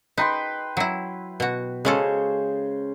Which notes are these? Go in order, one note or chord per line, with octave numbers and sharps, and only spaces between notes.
D#4 B4 G5 C6
F#3 E4
B2 F#4
C#3 G#3 C#4 A4 C5